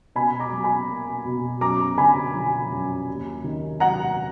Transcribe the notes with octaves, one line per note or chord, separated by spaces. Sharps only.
B2 G#5 B5
A#5 D6
F#3
G#5 B5
A#3
B2
F#2 A#5 D6
D3 G#5 B5
F3
F#2
D#2
D#3
F#3 F#5 A#5